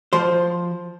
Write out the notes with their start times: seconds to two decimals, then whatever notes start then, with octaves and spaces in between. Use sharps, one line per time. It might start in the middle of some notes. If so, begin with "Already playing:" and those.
0.13 F3 C5